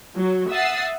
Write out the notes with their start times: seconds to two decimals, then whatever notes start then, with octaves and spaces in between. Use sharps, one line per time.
0.16 F#3
0.51 E5 F#5 D#6 E6 A6 C7